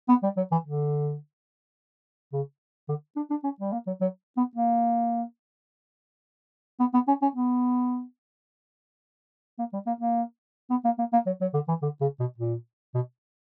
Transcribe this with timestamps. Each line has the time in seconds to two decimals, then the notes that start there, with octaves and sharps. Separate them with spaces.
0.09 B3
0.23 G3
0.37 F#3
0.51 E3
0.65 D3
2.33 C#3
2.89 D3
3.16 D4
3.30 D4
3.44 C#4
3.60 G3
3.72 A#3
3.87 F#3
4.01 F#3
4.37 B3
4.56 A#3
6.80 B3
6.94 B3
7.08 C#4
7.22 C#4
7.35 B3
9.59 A#3
9.73 G3
9.87 A#3
10.01 A#3
10.70 B3
10.85 A#3
10.99 A#3
11.13 A#3
11.26 F#3
11.41 F#3
11.54 D3
11.68 E3
11.82 D3
12.01 C#3
12.20 B2
12.38 A#2
12.95 B2